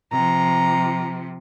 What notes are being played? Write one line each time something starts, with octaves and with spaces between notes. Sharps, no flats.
C3 F3 A#5